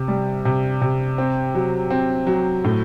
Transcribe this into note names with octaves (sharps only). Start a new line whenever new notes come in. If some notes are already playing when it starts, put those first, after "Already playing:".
Already playing: C3
G3
C3
C3
C4
F#3
C4
F#3
A2